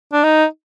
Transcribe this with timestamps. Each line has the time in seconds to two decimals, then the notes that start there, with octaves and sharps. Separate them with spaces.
0.13 D4
0.24 D#4